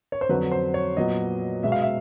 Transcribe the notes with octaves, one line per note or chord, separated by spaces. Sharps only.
C#5
C5
F2 D3 F#3 B4
C5
C#5
A#2 F#3 B3 D#5
B2 G#3 B3 E5
F5
E5